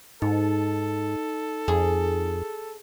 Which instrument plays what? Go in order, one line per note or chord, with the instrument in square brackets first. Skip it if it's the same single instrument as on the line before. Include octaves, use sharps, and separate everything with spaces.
[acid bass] G#2 [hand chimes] D#4 [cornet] A4
[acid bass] F2 [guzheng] G#4